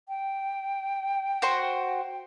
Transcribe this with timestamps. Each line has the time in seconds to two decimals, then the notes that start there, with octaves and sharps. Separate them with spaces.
0.08 G5
1.42 F#4 C5 C6